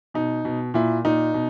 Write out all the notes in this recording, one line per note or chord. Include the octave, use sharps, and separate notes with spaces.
B2 D#4
B2
A#2 E4
A#2 D#4
B2